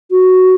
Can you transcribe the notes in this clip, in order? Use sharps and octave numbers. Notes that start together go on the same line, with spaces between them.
F#4